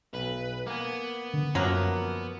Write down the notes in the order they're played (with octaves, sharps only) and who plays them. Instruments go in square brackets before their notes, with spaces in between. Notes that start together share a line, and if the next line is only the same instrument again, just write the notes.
[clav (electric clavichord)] B1 [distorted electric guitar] B4
[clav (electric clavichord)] A#3 G#5 [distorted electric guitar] B3
[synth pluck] D3
[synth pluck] F#2 C#6 [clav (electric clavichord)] F3 A#3 E5 [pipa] F#3 A#4 B4